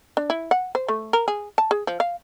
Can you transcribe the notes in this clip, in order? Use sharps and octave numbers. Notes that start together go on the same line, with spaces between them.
D4
E4
F#5
C5
A3
A#4
G#4
A5
G#4
F3
F5